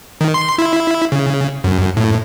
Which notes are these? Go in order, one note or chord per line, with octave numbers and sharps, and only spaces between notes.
D#3
C6
E4
C#3
F#2
A2